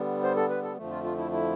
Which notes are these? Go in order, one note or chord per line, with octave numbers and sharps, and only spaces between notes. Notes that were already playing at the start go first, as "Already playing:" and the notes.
Already playing: D3 G3 B3
C5
A4
B4
A4
F2 D3 F3 A3
F4
F4
E4
E4